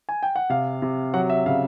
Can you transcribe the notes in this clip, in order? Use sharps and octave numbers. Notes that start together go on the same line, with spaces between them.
G#5
G5
F#5
C3 F5
C3
F#3 F#5
E5
C#3 F5